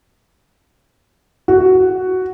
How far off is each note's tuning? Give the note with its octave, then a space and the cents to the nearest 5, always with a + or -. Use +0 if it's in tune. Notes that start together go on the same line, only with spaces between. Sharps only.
F#4 +5